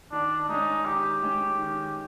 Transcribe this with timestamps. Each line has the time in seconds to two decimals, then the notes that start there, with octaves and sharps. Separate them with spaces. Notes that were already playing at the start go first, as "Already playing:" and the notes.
0.12 D#3 D4
0.48 G#3 C#4 D#4
0.85 D#3 G4
1.22 G#3 C#4
1.59 D#3